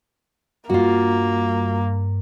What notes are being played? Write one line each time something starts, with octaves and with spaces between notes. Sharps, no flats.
G2 A#3 F4 F#4